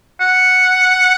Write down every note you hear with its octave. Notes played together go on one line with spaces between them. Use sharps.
F#5